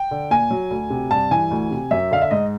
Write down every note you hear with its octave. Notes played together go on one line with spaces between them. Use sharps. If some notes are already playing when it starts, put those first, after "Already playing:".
Already playing: G5
D3
A#2 G#5
F#3
D2
C3
G2 A5
E3 G#5
D2
C3
F#2 E5
D3 F5
E5
G#2 D#5